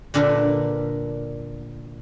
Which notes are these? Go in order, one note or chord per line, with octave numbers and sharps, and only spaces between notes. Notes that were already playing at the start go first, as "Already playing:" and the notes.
A#2 D3 D4 A#4 B4